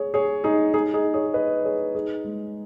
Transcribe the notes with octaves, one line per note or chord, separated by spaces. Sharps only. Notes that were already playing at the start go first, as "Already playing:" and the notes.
Already playing: G#4 C#5
G#4 C#5
D#4 G#4
D#4 G#4
D#4 G#4
G#4 C#5
B4 D#5
G#4 C#5
D#4 G#4
G#3